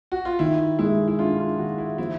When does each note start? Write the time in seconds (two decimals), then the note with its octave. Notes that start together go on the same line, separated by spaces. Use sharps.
0.12 F#4
0.25 F4
0.39 D#3 E4
0.79 G#3 E4
1.08 E4
1.19 D4 F4
1.38 F4
1.58 D#3 F#4
1.78 E4
1.98 F3 E4